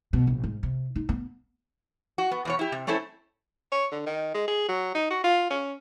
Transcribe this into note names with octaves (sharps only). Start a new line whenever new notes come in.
B2
A#1
G#2
C3
D#4
B3
F#4
B3
E2 B2 C#5
E4 G4
C3
A3 C4 C#4 E4 A4
C#5
D3
D#3
G#3
G#4
F#3
D#4
F#4
F4
C#4